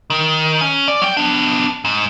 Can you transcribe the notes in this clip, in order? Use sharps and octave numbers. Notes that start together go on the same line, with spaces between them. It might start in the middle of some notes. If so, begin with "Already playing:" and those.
D#3
C#4
D5
F#3 G5
B3 D4
G#2